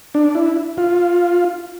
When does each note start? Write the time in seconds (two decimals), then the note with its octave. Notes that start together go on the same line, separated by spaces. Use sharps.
0.14 D4
0.35 E4
0.78 F4